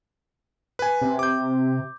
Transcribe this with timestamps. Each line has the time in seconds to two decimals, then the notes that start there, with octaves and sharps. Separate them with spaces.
0.79 B4 G#5
1.01 C3
1.19 D6 G6